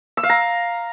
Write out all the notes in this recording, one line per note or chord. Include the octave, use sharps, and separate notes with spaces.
E6
F5
A#5